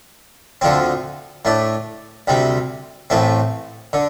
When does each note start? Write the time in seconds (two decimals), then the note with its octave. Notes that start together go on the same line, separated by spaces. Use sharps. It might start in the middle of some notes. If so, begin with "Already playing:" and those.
0.61 D2 D3 F3 C4
1.45 A2 A3 D4
2.27 D2 C3 G3 C4
3.10 A1 A2 A3 C4
3.93 D3